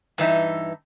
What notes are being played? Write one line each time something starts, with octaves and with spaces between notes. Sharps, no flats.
G2 E3 D#4 E5